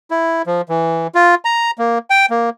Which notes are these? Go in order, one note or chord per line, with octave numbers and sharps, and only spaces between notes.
E4
F3
E3
F4
A#5
A#3
G5
A#3